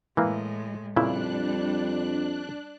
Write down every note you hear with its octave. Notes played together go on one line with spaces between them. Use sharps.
A2 E3 G#3 A#3
F2 A#2 C#3 G3 D4 E4 F#6